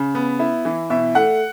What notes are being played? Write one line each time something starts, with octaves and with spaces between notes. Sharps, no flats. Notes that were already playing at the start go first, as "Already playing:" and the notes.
Already playing: C#3
B3
E4
E3
B2 E5
A3 F#5